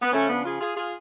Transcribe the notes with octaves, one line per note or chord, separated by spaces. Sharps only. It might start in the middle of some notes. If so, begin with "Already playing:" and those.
B3
C#3 F3 A3 C#4
B3 D4
F4 G#4
F4 G#4
F4 G#4